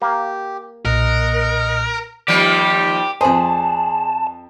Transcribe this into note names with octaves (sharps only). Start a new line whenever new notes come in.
A#3 G4
B1 A#2 A#4 D#5 F#5
D#2 F3 G3 G4
F2 G#4 C5 D5 A5 B5